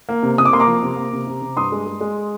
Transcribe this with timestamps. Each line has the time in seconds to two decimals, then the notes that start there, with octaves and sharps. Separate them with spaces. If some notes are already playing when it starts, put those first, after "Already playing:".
0.09 A#3
0.23 C3
0.38 C3 D#6
0.45 D6
0.53 A#3 C6
0.60 A#5 D6
0.67 F3
0.83 C3
0.97 A#3
1.13 C3
1.27 C3
1.42 C3
1.56 G2 C6 D#6
1.72 G#3
1.86 G#3
2.01 G#3